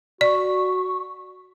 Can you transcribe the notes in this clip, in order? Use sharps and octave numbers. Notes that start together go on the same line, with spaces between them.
F#4 D5 C#6